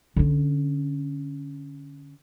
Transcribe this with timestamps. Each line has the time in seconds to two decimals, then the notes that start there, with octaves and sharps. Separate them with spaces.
0.16 D3 C#4